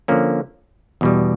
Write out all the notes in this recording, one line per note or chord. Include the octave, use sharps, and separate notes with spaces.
D3 F3 A#3 C#4
E2 B2 G3